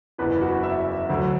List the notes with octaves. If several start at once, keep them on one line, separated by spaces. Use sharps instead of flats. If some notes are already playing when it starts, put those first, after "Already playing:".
F#1 E2 E3 B4
F#4
E5
D2 D3 F#3